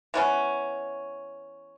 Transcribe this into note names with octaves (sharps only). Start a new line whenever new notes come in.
E3 B3 C#4